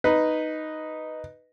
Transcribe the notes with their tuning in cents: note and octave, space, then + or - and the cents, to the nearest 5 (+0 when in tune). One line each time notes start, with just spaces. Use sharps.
D#4 +0 B4 +0